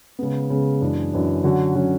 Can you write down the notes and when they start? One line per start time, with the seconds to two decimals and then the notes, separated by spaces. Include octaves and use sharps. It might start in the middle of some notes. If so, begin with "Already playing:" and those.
0.19 C#3 G#3 B3
0.50 C#3 G#3 B3
0.81 F#2 E3 G#3 D4 G#4
1.12 F#2 E3 G#3 D4 G#4
1.44 D3 F#3 C#4 F#4
1.75 D3 F#3 C#4 F#4